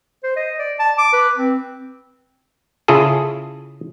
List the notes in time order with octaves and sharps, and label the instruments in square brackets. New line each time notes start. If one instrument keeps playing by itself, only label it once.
[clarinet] C5
D#5
D5
A5
D6
B4
C4
[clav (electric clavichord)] C#3 E4 F4 G#4 A4